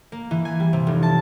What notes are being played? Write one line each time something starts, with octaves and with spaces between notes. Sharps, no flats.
A#3
E3
G#5
G3
C3
F1
A5